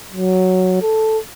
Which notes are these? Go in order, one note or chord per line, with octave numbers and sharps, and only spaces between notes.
F#3
A4